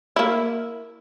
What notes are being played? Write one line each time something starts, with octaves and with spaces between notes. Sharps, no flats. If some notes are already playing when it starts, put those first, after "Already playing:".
A#3 E4